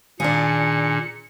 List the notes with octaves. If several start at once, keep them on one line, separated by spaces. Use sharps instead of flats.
A#2 D#3 D4 G#4 F5 C#7